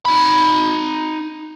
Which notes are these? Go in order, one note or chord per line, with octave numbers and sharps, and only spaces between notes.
D#4 B5